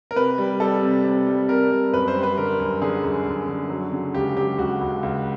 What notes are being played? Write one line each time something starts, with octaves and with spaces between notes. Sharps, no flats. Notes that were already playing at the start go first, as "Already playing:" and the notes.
A#4
C3 B4
G3
G3 A4
C3
C3
G3
C3 A#4
G3
F#2 B4
C5
G3
B4
D3 A#4
F#2
D3 G#4
F#2
F#2
D3
F#3
C#3
C#2 G4
F#3 G4
C#2 F#4
C#2
C#2